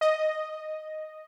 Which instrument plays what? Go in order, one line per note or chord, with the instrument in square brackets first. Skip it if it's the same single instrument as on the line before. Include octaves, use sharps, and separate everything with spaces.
[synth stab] D#5